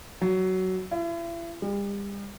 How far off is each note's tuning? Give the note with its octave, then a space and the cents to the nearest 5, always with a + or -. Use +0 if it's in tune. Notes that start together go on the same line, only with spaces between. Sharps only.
F#3 +15
E4 +40
G3 +40